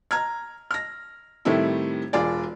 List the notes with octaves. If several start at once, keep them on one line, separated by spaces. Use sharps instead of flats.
A#5 F6 G#6
F6 A#6
A2 D#3 G3 A3 C4 E4
E1 F4 G#4 D5